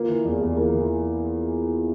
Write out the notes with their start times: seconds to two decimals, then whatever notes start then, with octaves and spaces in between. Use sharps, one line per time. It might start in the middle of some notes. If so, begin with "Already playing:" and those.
Already playing: A#3 F4
0.08 E3
0.25 E2
0.41 E2
0.57 A#3
0.74 E3